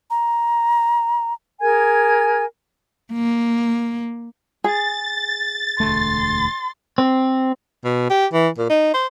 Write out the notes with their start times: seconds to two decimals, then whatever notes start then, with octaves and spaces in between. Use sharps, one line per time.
0.10 A#5
1.61 G#4 A#4 G#5 G#6
3.12 A#3
4.64 G#4 A6
5.80 E1 D2 A3 C6
6.98 C4
7.84 B2
8.10 G4
8.33 E3
8.58 A#2
8.69 D#4
8.94 C5